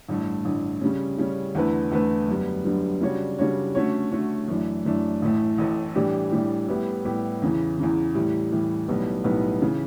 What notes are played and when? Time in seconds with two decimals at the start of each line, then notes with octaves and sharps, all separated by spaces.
0.08 A1 G2 D3 A3
0.45 A1 G2 D3 A3
0.81 C#3 G3 C#4
1.18 C#3 G3 C#4
1.55 E2 D3 A3 E4 B4
1.91 E2 D3 A3 E4 B4
2.28 F#2 D3 G3 B3
2.65 F#2 D3 G3 B3
3.01 C#3 G3 D4 F#4 C#5
3.39 C#3 G3 D4 F#4 C#5
3.75 D3 A3 C#4 F#4 C#5
4.11 D3 A3 C#4 F#4 C#5
4.48 F#2 E3 A3 D4
4.85 F#2 E3 A3 D4
5.22 A1 A2 E3 A3
5.58 A1 A2 E3 A3
5.95 A2 E3 G3 D4 G4
6.32 A2 E3 G3 D4 G4
6.68 A2 G3 B3 E4 G4
7.05 A2 G3 B3 E4 G4
7.42 E2 C#3 E3
7.78 E2 C#3 E3
8.15 A2 E3 G3
8.51 A2 E3 G3
8.88 B1 A2 G3 B3
9.24 B1 A2 G3 B3
9.62 C#3 E3